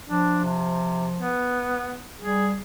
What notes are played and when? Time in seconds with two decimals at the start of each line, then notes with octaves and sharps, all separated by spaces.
0.08 F3 D4
0.45 C3
1.20 B3
2.19 G3 G#4